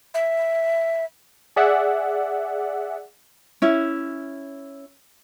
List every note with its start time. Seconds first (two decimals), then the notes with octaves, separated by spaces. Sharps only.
0.14 E5
1.56 G#4 D5 E5 F#5
3.62 C#4 E4